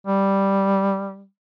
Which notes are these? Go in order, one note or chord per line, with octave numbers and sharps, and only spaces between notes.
G3